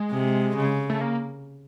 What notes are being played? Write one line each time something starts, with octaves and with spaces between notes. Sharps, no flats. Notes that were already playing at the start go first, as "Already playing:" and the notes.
Already playing: G#3
C3
C#3
A3
A#3